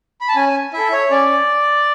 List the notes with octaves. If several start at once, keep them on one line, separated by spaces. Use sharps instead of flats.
B5
A5
C#4 G#5
E4 A4 E5
C#5
C#4 D5